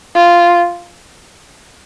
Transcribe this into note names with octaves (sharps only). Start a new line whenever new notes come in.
F4